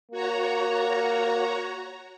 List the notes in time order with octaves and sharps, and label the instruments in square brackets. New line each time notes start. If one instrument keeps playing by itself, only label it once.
[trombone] A#3 [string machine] F#4 C#5 A#5